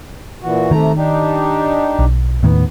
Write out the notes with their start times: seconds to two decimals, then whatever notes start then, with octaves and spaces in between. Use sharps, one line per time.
0.43 A#2 E3 F#4
0.71 C3 D#3 A3 A#5
0.96 D4 D#4 G4
1.99 B1
2.43 D#2 A2 D#3 B3